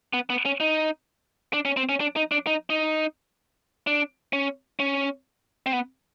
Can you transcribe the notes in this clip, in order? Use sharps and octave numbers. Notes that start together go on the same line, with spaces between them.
B3
B3
C#4
D#4
D4
C#4
C4
C#4
D4
D#4
D4
D#4
D#4
D4
C#4
C#4
C4
B3